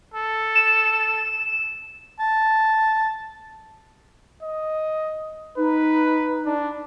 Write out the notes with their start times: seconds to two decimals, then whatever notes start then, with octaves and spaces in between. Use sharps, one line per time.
0.14 A4
0.55 E7
2.20 A5
4.43 D#5
5.58 D#4 B4
6.46 D4